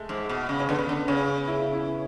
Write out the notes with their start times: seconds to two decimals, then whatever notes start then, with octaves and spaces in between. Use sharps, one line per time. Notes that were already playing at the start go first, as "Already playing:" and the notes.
Already playing: G#3 A3
0.09 G#2
0.29 B2
0.49 C#3
0.60 C#4
0.69 D3 B3
0.79 C#3
0.89 D3
1.08 C#3 C#4
1.47 E4
1.74 E4